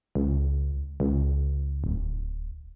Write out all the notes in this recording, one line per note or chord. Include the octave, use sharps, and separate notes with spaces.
C#2
C#2
D1